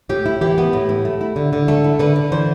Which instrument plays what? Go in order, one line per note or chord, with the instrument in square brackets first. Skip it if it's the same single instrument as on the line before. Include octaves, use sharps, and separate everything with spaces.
[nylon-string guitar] A2 G4
E4
E3 G4
B3
A2
E4
A3
E4
D3
D3
A3 A4
E4
D3 B4
D3
E3 C5